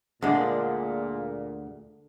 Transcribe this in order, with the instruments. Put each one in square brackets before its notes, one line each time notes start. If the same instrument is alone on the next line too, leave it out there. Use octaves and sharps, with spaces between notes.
[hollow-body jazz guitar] D2 G#3 [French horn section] A#2 [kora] D3 G#4 D5